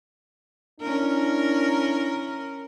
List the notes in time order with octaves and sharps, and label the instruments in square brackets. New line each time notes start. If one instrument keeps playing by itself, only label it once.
[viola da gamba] C#4 A#4 [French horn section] D4 E4